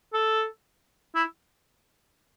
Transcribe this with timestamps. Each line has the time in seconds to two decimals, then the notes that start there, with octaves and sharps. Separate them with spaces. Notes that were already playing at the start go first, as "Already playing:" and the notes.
0.13 A4
1.15 E4